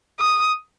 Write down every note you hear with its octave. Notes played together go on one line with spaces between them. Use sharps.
D#6